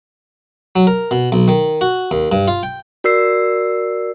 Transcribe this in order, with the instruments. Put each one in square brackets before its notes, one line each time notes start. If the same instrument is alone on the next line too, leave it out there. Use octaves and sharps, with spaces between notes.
[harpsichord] F#3
A#4
B2
B1
D#3
F#4
D#2
G2
F4
G5
[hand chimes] F#4 A#4 D5 E6 C7